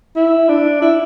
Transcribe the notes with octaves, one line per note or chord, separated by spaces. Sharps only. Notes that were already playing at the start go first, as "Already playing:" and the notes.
E4
D4
E4